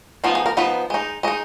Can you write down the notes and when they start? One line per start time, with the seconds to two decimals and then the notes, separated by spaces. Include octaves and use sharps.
0.24 F3 B3 D#4 F4
0.35 G#4
0.46 A#4
0.57 F3 B3 D#4 B4
0.90 G#3 D#4
1.23 G#3 D#4 D#5